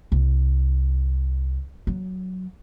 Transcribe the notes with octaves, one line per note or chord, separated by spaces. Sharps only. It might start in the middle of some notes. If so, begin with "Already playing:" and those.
C2
F#3